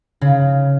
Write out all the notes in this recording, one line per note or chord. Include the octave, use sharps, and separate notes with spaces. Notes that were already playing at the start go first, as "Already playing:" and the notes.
C#3